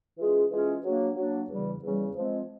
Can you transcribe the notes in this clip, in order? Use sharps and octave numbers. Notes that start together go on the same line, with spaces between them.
E3 G#3 C#4 F4 G#4
E3 G#3 C#4 F4 G#4
F#3 A#3 D4
F#3 A#3 D4
E2 C#3 E3 G3
E2 C#3 E3 G3
F3 G#3 C4